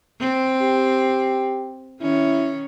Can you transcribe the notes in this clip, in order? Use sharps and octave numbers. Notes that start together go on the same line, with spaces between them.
C4
G4
D#3 C#4 E4